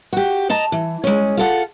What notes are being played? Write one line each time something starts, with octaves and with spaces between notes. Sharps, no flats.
F#4 G4
D#5 A5 A#5
E3
G#3 C#4
F4 A4 F#5